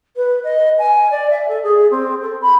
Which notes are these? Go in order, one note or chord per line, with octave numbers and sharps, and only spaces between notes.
B4
D#5
G#5
D5
E5
A4
G#4
C4
A4
B5